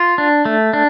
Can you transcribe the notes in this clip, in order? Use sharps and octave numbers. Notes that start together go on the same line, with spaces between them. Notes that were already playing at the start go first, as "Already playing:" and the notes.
Already playing: F4
D4
A3
D4